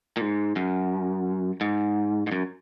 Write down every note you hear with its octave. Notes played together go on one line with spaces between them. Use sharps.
A#2
G#2
F#2
G#2
G#2
F#2